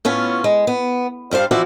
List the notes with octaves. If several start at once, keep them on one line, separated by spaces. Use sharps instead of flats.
A2 B3 C#4 F4
G#3
B3
G2 G3 C5 F5
E3 F3 B3 F#4 D5 E5